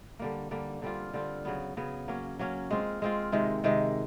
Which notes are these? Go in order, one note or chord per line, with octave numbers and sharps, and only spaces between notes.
D3 G3 A#3
D3 G3 A#3
D3 G3 C4 F4
D3 G3 C4 F4
C#3 F#3 B3
C#3 F#3 B3
F#3 A#3 C#4
F#3 A#3 C#4
G#3 C4 F4
G#3 C4 F4
C3 D#3 G#3
C3 D#3 G#3